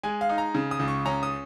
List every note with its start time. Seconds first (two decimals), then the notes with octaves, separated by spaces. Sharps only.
0.03 G#3 G#5
0.21 F5
0.29 D#4
0.38 A#5
0.55 C#3
0.71 D#6
0.79 C#2
0.88 C#6
1.05 C#4 A#5
1.23 D#6